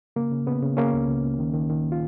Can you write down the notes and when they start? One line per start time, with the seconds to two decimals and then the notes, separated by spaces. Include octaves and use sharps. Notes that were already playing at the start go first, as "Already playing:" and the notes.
0.16 C#3 A#3
0.31 C#3
0.46 C#3 B3
0.62 C#3
0.77 C#3 A#3 C#4
0.93 C#2
1.08 C#2
1.24 C#2
1.39 D#3
1.53 D#3
1.70 D#3
1.92 F4